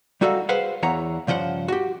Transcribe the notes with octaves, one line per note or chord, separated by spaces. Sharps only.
G3 D#4 F#4 A4 E5 F5
G#4 B4 C5 F5 F#5
E2 E3 C#5 A#5
G2 C#3 F3 C5 F#5
F#4 G4